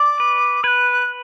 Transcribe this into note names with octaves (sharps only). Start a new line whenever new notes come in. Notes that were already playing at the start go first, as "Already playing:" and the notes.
Already playing: D5 D6
B4
B4 F#6 G#6